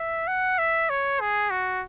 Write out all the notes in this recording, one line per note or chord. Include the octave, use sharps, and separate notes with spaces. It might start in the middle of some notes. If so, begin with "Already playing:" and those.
Already playing: E5
F#5
E5
C#5
G#4
F#4